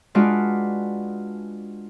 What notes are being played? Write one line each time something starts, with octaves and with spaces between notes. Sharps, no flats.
G#3 D4 F4 F#4 B4 D5